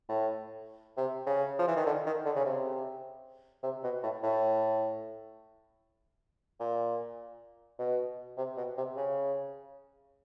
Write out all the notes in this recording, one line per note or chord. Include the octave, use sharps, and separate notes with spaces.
A2
C3
C#3
F3
E3
D#3
D3
D#3
D3
C#3
C3
C3
B2
A2
A2
A#2
B2
C3
B2
C3
C#3